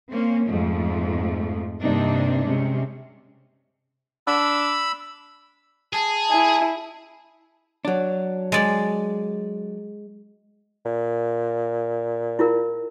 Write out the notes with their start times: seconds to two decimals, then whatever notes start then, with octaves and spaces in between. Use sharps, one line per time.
0.11 A#3 C4 C#4
0.46 F2 G#2 F3 A3
1.82 G2 C3 A#3 C4 D4 D#4
2.46 C3 G#3 C#4
4.27 D4 B5 E6
5.93 G#4 A5
6.31 E4 G#5
7.85 F#3 D4
8.52 G#3 D5
10.85 A#2
12.39 E4 F4 A#4